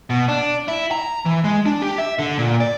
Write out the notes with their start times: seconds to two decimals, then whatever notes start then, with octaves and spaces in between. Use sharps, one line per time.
0.10 B2
0.28 D4
0.68 E4
0.91 A#5
1.26 E3
1.44 G#3
1.66 D4
1.82 G4
1.98 E5
2.19 D3
2.38 A#2
2.60 D5